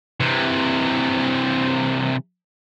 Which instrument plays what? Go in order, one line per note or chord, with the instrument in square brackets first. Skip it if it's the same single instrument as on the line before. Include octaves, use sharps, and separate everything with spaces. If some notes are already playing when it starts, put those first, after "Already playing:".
[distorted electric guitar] C3 E3